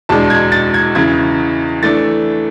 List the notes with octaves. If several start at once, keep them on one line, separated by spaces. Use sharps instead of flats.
E2 B2 G#3 D4 A5
G#6
A6
G#6
E2 C#3 E3 G#6
E3 A3 D4 A6